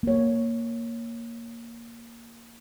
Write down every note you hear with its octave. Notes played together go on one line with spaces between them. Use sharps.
A#3 C#5